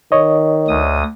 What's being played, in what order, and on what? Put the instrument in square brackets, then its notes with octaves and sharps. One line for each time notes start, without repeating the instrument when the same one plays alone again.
[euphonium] D#3 [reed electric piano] C#5 D#5
[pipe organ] D2 D#6